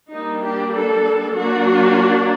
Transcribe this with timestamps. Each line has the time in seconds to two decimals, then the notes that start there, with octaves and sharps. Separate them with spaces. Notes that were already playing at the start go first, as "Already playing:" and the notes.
0.12 G3 A#3 D4 D#4
0.43 G4
0.73 A4
1.35 F#3 A#3 D4 F#4